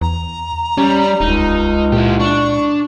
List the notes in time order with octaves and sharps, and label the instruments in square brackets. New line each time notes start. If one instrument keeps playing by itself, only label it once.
[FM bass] E2 [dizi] A#5
[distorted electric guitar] G3 [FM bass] C#4
[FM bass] D#1 [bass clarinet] C#2 [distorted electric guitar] D#4
[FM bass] A#2 [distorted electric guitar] E4 G4
[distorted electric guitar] D4 [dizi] C#6